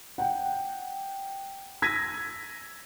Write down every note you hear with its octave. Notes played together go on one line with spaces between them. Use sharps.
F#5 G5
E6 G#6 A#6 B6 D#7